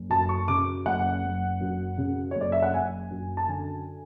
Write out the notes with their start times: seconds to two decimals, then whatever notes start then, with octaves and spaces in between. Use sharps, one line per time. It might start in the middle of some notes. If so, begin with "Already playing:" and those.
Already playing: F#1
0.10 F#2 A5
0.29 C#6
0.48 C#3 D6
0.85 F#1 F#5
1.22 F#1
1.60 F#2
1.98 C#3
2.31 F#1 C#5
2.41 D5
2.52 E5
2.62 F#5
2.74 F#1 G#5
3.11 F#2
3.37 A5
3.48 D3 G#5